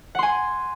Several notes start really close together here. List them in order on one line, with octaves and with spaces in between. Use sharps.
F#5 C6 G#5